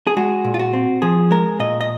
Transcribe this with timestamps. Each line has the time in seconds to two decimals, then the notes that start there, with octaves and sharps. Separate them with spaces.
0.07 G#4
0.17 G#3 F#4
0.44 A#2
0.54 F4
0.59 F#4
0.73 C4
1.02 F3 G#4
1.31 G#3 A#4
1.60 A#2 D#5
1.81 D#5